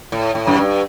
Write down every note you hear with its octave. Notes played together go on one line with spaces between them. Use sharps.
A2
A2
F#2
G2